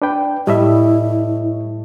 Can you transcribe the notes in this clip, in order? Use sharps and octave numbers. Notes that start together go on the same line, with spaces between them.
D4 B4 G5
A2 G3 E4 D#5 E5